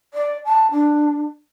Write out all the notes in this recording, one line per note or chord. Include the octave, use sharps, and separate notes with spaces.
D5
A5
D4